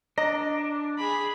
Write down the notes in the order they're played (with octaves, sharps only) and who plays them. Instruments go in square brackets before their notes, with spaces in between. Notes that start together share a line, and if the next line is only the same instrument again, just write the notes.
[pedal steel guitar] D4 [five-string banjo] D#5 [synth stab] A#5
[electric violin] G#4 B5